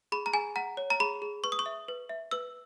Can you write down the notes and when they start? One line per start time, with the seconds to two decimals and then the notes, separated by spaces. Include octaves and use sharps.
0.12 G#4 B5
0.26 A#5
0.33 G#4 G#5
0.56 F#5 A#5
0.77 C#5
0.90 A#5
1.00 G#4 B5
1.22 G#4
1.44 B4 C#6
1.52 D#6
1.59 C#6
1.66 E5
1.88 B4
2.09 E5
2.31 B4 E6